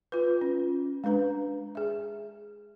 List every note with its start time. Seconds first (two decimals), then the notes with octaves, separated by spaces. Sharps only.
0.12 F4 B4
0.41 C#4
1.04 G#3 D4 B4 A#5
1.75 G#4 E5